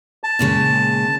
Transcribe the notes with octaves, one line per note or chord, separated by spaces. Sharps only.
A5
A#2 C#3 G#3